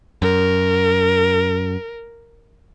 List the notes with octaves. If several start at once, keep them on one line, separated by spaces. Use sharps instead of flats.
F#2 A#4